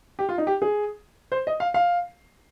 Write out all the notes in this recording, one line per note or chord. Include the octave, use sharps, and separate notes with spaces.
G4
F4
D#4
G4
G#4
C5
D#5
F5
F5